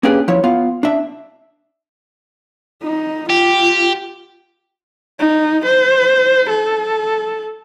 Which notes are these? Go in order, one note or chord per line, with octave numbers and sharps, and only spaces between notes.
A#3 C#4 D4 G4 G#4 B4
F3 E4 C#5
B3 F4 F5
D4 E5
D#4
F4 G4
D#4
C5
A4